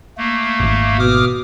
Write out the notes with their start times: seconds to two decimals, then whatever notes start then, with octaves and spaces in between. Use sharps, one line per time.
0.18 A3 A#3
0.59 D#1 G#1
0.99 B2 D6 D#6 F6